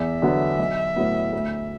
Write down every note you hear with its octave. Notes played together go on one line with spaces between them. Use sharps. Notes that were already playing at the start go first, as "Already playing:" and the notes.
Already playing: E2 E5
D3 F#3 B3
B1
A2 F#3 B3
D2